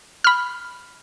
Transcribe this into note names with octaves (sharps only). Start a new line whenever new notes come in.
B5 F6